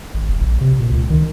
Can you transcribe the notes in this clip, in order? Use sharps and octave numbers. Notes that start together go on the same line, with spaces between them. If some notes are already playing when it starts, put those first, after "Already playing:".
G#1
F#1
A#1
C3
A#2
C#2
D#3